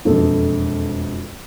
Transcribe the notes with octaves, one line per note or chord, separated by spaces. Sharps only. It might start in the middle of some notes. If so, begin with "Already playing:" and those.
E1 F2 B2 A4